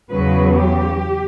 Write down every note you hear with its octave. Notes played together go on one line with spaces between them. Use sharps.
E2 C#3 F#3 B4
G4